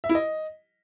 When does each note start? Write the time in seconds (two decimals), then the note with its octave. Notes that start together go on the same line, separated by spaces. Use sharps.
0.04 E5
0.09 E4
0.15 D#5